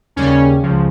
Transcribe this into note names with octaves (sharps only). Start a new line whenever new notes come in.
D#2 C#3 G3 C#4
C#2 C#3 F3